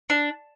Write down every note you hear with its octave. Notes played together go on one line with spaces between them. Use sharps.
D4